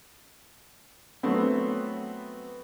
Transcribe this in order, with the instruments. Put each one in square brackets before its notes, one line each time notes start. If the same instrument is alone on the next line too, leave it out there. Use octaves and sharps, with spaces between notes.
[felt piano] F#3 A3 B3 C4